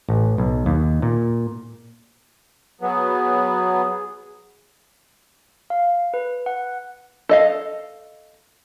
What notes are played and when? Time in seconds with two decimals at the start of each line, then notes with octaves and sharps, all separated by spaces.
0.09 A1
0.38 B1
0.66 D#2
1.02 A#2
2.81 F#3 B3 G#4
5.70 F5
6.14 B4
6.46 F#5
7.29 A4 D#5 F5